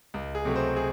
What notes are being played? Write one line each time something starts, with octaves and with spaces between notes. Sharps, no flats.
C#2
G#4
C3 F#3 A3
C5
G#4